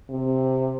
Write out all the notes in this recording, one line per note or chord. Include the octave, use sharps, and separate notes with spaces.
C3